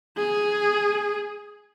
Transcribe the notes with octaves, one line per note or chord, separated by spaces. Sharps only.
G#4